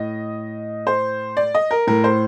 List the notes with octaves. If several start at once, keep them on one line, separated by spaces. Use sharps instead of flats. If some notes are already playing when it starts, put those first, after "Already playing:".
Already playing: A2 D#5
C5
D5
D#5
A#4
A2 A#4
C5